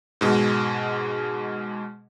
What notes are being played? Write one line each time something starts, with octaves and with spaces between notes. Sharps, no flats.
G#2 B2 G#3